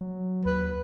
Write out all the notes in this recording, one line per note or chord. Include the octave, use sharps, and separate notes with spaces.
F#3
D#2 B4